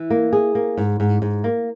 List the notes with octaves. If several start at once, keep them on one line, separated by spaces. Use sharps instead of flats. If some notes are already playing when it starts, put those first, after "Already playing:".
Already playing: E3
A#3
G#4
A#3
G#2
G#2
G#2
A#3